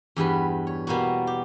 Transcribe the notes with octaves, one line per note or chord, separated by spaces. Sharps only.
E2 G2 G3 B4
C#5
B2 G3 A#3 B3 F#4
G4